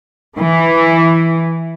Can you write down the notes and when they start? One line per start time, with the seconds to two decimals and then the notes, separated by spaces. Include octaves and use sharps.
0.38 E3